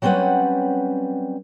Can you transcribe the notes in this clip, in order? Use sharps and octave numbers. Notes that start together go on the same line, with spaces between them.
F#3 G3 C4 C#4 B4 F#5